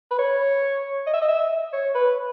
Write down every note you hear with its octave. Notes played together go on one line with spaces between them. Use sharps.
B4
C#5
D#5
E5
D#5
E5
C#5
B4